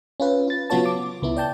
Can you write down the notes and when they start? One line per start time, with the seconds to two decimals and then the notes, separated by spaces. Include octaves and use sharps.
0.20 C#4 F4 B4
0.48 F4 A6
0.70 C#3 F#3 B3 F4 C#5 A5
0.86 D6
1.22 C#2 B3 E4
1.37 D5 G5 A5 G6